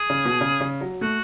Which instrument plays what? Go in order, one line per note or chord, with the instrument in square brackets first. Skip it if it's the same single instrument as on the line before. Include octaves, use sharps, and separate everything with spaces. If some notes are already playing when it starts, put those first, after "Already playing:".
Already playing: [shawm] G#4
[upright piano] C#3
B2
C#3
C#3
F#3
[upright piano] A3 [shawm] F#4